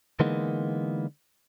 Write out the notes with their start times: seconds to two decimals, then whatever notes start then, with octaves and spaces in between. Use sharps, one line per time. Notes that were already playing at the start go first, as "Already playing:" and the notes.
0.20 D3 E3 G#3 A#3 B3 D#4